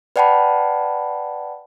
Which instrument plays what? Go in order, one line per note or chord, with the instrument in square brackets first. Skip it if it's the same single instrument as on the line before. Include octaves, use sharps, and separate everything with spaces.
[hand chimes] B4 D5 F#5 G5 A5 B5